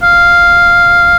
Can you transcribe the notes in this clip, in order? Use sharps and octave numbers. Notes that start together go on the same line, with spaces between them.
F5